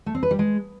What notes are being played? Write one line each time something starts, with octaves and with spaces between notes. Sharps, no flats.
A3
C4
B4
G3
G#3